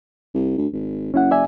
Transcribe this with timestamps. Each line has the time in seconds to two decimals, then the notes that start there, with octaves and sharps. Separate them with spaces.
0.34 C2
0.58 D2
0.73 G#1
1.14 F#1 C#4 E4 F#5
1.31 D5 E5 G#5